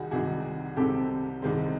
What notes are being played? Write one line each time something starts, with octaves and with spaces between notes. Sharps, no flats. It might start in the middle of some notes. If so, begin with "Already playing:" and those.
Already playing: C2 D#3 F#4 G#4
C2 C3 D#3 G#3 F#4 G#4
C2 C3 D#3 G#3 C4 G4 A4
C2 C3 D#3 G#3 C4